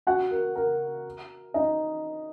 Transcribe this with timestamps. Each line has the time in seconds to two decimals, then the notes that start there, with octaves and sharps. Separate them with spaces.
0.07 F#4 F#5
0.31 A#4
0.56 A#4
1.54 D#4 D#5